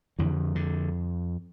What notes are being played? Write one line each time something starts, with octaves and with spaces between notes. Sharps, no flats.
F2 D3 E3
D3